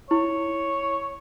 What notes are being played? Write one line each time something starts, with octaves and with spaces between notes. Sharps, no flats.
E4 C#5